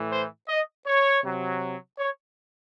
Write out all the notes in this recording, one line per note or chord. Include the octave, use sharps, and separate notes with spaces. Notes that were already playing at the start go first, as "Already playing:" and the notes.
Already playing: A2 E3
C5
D#5
C#5
C3 F#3
C#5